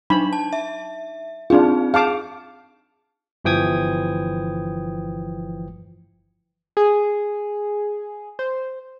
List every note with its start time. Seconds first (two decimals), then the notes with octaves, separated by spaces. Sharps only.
0.10 F#3 D4 D#4 B5
0.33 A5
0.53 E5
1.50 C4 D4 D#4 F4 G#4
1.94 G#4 F5 A5 D6
3.45 G1 E3 F3 G5 D#6 G#6
6.77 G#4
8.39 C5